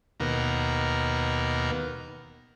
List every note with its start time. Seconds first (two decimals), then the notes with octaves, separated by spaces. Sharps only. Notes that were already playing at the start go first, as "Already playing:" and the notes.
0.20 D#2 B2 A#3